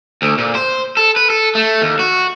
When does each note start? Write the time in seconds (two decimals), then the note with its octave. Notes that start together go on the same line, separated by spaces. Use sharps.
0.22 D2
0.38 A#2
0.55 C5
0.97 A4
1.16 B4
1.30 A4
1.55 A3
1.82 D#2
1.99 F#4